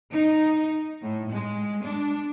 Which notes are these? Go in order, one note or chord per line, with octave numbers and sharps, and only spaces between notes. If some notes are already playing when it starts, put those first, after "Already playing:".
D#4
A2
G#3
D4